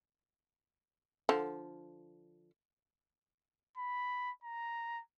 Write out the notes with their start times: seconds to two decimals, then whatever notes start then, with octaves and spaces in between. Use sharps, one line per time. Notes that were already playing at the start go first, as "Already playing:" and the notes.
1.29 D3 F3
3.77 B5
4.44 A#5